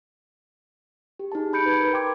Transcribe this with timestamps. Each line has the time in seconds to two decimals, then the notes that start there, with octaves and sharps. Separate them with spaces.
1.19 G4
1.32 D#4 G#4 A5
1.53 D#4 B5 G6 C#7 D7
1.66 B4 G#6
1.80 A#4 B4
1.93 G5 C6 D6 G#6